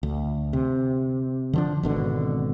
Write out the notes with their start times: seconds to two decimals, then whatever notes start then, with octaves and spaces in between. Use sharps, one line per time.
0.03 D2
0.53 C3
1.53 D3 F3 D4
1.83 G#1 B2 D3